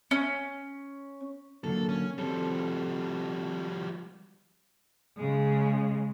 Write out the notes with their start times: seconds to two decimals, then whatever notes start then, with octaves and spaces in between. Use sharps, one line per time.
0.11 C#4
1.64 D3 F#3 A#3 A4
1.89 C#4
2.18 F3 G3 C4 A4
5.17 C#3 G#3